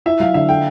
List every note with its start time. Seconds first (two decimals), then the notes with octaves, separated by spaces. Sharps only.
0.06 E4 E5
0.20 F#3 F5
0.34 D3 E5
0.49 A4 G5